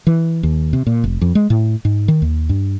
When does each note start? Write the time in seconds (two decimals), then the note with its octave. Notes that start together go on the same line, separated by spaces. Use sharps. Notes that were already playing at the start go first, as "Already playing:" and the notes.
0.07 E3
0.43 D#2
0.73 C3
0.87 A#2
1.04 F1
1.21 F2
1.35 G#3
1.50 A2
1.85 G#2
2.08 D#3
2.22 D#2
2.49 G2